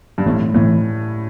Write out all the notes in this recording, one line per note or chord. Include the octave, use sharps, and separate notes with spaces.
G2
A2 E3 A3 C4
A2 E3 A3 C4